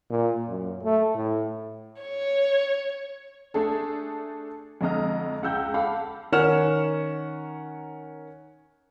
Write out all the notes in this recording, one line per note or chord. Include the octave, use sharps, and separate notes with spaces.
A#2
F#2
A3
A2
C#5
A3 D4 G#4 A4
F2 D3 G#3 D#5 A#5 F6
C#2 F#5 G5 E6 G6
A4 F5 F#5 B5 D6
D#3 C#4 A#4 F#5 F6 E7